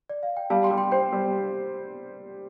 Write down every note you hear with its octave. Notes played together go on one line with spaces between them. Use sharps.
D5
F5
G5
G3 F5 A5
G5 C6
G3
G5 C6
C5 G5 C6
G3